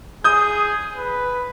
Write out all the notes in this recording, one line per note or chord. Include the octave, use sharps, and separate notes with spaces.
G#4 D#6 G6
B4